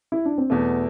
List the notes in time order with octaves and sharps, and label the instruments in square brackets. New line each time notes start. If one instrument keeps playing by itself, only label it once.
[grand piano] E4
D4
C4
[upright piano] E2 B2 A3 [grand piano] B3